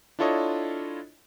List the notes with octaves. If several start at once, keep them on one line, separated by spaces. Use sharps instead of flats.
D4 E4 F4 A4 C#5 D#5